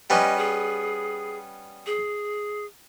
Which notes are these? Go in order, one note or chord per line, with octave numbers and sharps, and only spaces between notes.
G3 B3 C#4 D#5
G#4
G#4